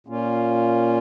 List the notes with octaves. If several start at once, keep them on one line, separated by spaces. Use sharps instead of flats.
A#2 A#3 C#4 F4